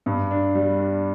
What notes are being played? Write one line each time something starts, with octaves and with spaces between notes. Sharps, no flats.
G2
D4
G3
D4